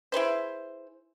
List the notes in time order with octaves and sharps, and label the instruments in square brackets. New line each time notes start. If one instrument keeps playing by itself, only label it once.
[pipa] E4 G#4 B4 C5